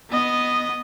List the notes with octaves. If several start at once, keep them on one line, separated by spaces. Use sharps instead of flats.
B3 D#5